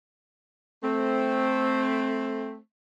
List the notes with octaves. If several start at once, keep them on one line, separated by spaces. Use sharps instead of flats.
A3 C4